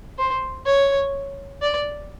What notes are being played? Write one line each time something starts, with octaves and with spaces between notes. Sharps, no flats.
C5
C#5
D5